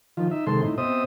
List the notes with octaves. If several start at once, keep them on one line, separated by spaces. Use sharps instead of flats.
D#3 F3 F4
D#4 E5
C3 D#3 G#3 A4 C6
A2 D#4 E4
B2 C4 C5 D#5 E5 D#6